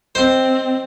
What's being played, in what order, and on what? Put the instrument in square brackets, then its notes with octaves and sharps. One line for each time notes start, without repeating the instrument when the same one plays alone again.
[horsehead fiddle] C4 [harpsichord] C5 [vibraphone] D#5 G5